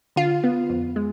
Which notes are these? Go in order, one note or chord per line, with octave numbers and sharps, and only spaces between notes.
D3 F4
B3
F2
G#3